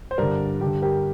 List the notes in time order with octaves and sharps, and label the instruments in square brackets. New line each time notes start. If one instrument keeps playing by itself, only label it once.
[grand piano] C5
G2 D3 A#4 D5
G2 D3 G4
G4 A#4